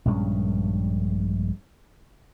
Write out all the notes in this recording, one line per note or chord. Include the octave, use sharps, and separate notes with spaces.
A#1 G2 G#3 C#4